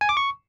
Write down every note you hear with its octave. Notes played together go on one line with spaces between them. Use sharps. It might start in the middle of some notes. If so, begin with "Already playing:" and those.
G#5
D6
C#6